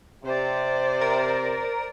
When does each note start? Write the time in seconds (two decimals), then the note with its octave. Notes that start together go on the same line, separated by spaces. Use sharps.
0.24 C3 C5 D5
1.01 A#4